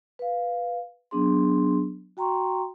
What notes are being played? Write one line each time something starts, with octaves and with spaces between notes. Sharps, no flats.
B4 F5
F#3 B3 D4 G#4 C6
F#4 G5 A#5 C6 C#6